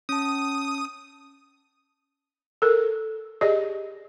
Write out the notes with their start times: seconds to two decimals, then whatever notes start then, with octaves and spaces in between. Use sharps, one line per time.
0.09 C#4 A5 D#6
2.62 A4 A#4
3.41 G4 G#4 D5 D#5